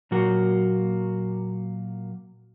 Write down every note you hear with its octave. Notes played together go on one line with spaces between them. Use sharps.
A#2 F#3 A#3 F#4